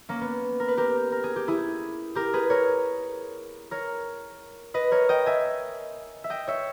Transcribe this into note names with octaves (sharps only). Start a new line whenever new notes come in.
A#3 C#4
B3
A#4
B4
G4 A#4
A#4
G#4
G4
E4 G#4
G4 A#4
G#4 B4
A#4 C#5
A#4 C#5
B4 D#5
A#4 C#5
D#5 G5
E5 G#5
E5
D#5 G5
C#5 E5